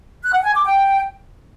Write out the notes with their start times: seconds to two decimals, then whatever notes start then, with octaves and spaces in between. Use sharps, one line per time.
0.23 F#6
0.33 F#5
0.43 G#5
0.54 D6
0.64 G5